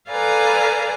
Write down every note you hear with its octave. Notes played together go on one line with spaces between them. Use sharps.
A4 B4 D5 F5 G#5 A#5